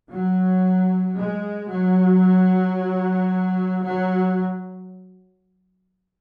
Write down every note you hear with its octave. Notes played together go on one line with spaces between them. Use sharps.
F#3
G#3
F#3
F#3